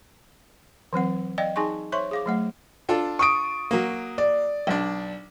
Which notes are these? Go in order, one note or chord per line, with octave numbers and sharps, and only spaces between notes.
E3 F#3 C4 F#5
D5 D#5 F5 G5
D#4 G#4 G#5 C6 C#6
C5 C#5 E5 C6 C#6
G#4 F5 D6
F#3 A3 F#5
D4 F4 A4
C#6 D#6 D7
F#3 A#3
D5
B1 D4